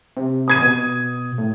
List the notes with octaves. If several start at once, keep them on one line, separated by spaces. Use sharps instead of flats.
C3
D#6 G#6 D#7
B2
A2